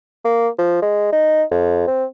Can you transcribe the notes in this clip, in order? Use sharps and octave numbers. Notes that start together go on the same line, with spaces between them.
A#3
F3
G#3
D#4
F2
C4